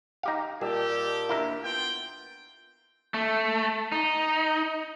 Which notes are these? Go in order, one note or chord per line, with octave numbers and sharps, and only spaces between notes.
D#4 G4 F5
A#2 G3 G4 D#5 A5 E6
D#2 A#3 D4 E4 A#4 E5
B3 F4 G5
A3
D#4